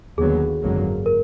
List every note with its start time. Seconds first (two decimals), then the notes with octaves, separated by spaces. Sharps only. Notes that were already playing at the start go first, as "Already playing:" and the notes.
0.18 D#2 D3 F#3 B3 G#4
0.62 G#1 F#2 D3 F#3 A#3
1.06 A#4